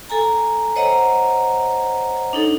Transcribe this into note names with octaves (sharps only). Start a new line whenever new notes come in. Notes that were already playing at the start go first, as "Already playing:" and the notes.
A4 G#5 A#5
C5 C#5 D#5 F#5 A#5
D4 D#4 A4